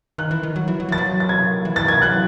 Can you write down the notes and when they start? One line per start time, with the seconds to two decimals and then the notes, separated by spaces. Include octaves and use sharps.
0.18 D#3 F#6
0.31 E3
0.43 D#3
0.56 F#3
0.68 E3
0.80 F#3
0.89 E3 A6
0.98 F#3
1.20 A6
1.29 G#6
1.65 E3
1.76 A6
1.88 G#6
2.02 F#3 F#6